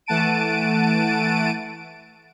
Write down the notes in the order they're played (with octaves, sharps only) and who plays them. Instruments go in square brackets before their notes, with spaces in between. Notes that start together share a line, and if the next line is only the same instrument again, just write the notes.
[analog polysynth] E3 A3 F#5 A5 D7 D#7